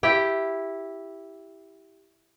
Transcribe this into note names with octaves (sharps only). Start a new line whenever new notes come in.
E4 G4 G5